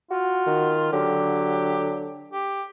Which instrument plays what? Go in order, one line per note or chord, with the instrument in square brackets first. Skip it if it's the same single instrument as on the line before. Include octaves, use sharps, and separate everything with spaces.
[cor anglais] F4 [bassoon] F#4
[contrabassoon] D#3
[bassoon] D3 [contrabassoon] F#3 [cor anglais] G4
[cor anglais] G4